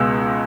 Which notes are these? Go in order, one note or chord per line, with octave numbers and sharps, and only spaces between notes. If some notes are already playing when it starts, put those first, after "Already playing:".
Already playing: C#2 B2 G#3 E6